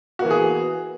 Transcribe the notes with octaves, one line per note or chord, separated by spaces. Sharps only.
E3 A#3 B3 F#4 G#4